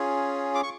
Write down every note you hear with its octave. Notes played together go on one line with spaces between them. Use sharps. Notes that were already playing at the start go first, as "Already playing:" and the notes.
Already playing: C#4 F4 G#4
D6
C#6